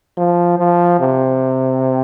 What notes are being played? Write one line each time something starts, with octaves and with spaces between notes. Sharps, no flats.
F3
F3
C3